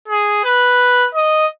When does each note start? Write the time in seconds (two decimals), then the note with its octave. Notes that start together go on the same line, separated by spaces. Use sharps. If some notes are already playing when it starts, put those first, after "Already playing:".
0.09 G#4
0.44 B4
1.15 D#5